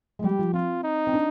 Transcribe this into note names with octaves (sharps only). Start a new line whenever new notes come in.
G#3
G3 G4
F3
C4 F4
D#4
C4
D4